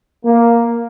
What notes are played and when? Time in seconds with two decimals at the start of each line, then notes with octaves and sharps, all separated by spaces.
0.25 A#3